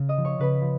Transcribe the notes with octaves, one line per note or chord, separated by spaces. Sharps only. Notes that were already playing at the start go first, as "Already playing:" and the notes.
Already playing: C#3
D#5 D#6
F3
C#5 C#6
C#3 B4 B5
F3